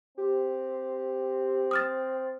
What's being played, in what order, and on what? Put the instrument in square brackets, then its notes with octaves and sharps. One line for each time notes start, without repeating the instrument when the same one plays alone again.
[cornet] C4 [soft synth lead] G4
[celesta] D#6 F6 A6